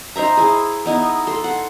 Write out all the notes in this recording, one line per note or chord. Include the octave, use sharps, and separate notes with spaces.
D#4 C5 E5 A#5
E4 G#4
B3 D#4 E4
A4 C6
F#5